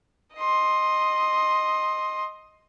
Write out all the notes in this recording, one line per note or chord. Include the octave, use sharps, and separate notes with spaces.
D#5 C6